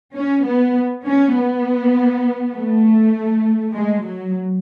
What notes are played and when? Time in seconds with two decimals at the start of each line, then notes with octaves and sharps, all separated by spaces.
0.17 C#4
0.46 B3
1.06 C#4
1.36 B3
2.55 A3
3.74 G#3
4.04 F#3